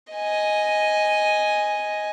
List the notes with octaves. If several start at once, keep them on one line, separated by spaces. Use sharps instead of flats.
D#5 G#5